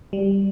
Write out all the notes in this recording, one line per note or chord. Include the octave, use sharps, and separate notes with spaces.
G3